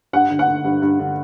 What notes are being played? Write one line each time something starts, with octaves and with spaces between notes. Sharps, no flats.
G2 F#5
D3
F#5
D3
G2
G2
D3